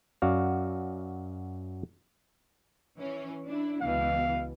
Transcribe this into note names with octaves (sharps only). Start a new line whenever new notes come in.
F#2 F#3 F#4 D5 F5
E3 C#4
D4 E4
C#2 B2 E3 F5